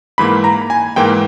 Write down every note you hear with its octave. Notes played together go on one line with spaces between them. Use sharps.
G#2 E3 A#3 B5
A#5
G#5
G#2 E3 A#3 G5